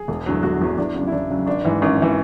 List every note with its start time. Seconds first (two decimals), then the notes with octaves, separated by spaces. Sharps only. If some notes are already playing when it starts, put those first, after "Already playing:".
Already playing: G#4
0.08 E1
0.26 E2 D3 F#3
0.43 E1 F#4
0.61 E2 D3 F#3
0.78 E2 D4
0.95 C#3 F#3
1.07 E4
1.12 E2 D4
1.30 C#3 F#3
1.46 G#1 D4
1.64 G#2 E3
1.82 G#1 C#4
2.02 E3